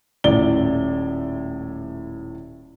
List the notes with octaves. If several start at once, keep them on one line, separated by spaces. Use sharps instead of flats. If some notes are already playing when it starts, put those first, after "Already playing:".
D#1 A2 D5 G7